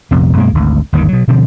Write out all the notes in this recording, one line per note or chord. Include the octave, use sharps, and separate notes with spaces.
A#1 F2 C3 B3
F#2 B2 G#3 A#3
G#1 D2
G1 D#2 G#2 D#3
B2 F#3
B2 D3 F3 C4